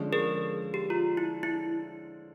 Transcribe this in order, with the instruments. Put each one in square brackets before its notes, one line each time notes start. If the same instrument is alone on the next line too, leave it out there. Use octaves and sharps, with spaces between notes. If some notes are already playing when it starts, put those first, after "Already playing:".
Already playing: [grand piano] D3 F3 G#3 C#4
[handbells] G#4 A#4
G4
F4
E4
E4